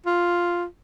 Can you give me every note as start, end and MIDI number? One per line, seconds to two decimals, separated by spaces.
0.06 0.65 65